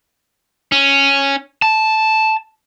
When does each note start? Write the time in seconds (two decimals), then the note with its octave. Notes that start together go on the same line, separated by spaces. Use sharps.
0.72 C#4
1.62 A5